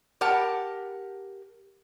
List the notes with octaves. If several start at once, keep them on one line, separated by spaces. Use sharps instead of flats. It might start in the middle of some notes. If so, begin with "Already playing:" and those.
G4 A#4 F#5 A5